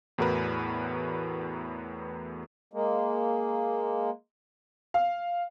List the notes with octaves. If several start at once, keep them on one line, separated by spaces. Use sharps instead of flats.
E2 A2 F#4 A#4 B4
G#3 A#3
F5